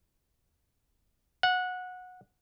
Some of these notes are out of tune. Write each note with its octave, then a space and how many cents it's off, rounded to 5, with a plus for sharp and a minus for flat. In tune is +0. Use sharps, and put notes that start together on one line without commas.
F#5 -15